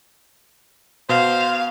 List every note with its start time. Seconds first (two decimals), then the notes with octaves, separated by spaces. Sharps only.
1.09 B2 C5 F5